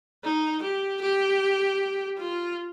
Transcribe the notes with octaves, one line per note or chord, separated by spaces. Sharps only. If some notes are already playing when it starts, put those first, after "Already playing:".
D#4
G4
G4
F4